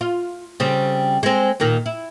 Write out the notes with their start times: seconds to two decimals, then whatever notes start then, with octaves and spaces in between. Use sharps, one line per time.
0.01 F4
0.60 C#3 G3 C4
1.23 G#3 C4
1.60 D#2 A#2 D#3
1.86 E4